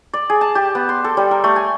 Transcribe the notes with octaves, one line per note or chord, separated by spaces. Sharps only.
D5
G#4
A5
G4
B3
C6
A4
G3
A#4
A3
G#5